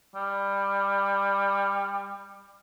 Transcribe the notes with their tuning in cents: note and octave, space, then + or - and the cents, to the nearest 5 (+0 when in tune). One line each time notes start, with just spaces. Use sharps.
G3 +20